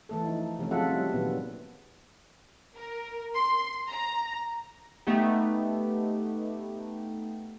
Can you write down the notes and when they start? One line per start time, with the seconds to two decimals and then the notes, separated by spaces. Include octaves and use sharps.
0.09 E3 A3 A4
0.24 F3 D#4
0.59 C3 F3 A3 C#4
0.71 F#3 G#3 F4 A4 E5 F#5
0.89 G3
1.13 A#2 D#3 F#3 B3
2.76 A#4
3.34 C6
3.89 A#5
5.07 A3 B3 D#4 G4